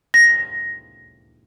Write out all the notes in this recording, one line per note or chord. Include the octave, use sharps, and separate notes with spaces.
A#6